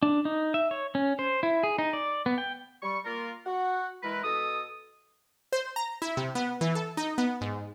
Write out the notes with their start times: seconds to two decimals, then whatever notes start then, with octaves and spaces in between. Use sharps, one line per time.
0.03 D4
0.25 D#4
0.54 E5
0.71 C#5
0.95 C#4
1.19 C5
1.43 E4
1.63 G#4
1.78 D#4
1.93 D5
2.26 B3
2.38 G5
2.83 G3 C#6
3.05 A#3 F4 A#4
3.46 F#4 F#5
4.03 E3 G#3 E4 A#4 B4
4.24 B2 A4 D#5 D#6
5.52 C5
5.76 A#5
6.02 E4
6.17 C3
6.35 B3
6.61 E3
6.75 A4
6.97 D#4
7.18 B3
7.41 G#2